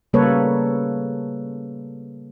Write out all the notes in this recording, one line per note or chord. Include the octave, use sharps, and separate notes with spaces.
C#3 G3 A#3 A4 B4 C#5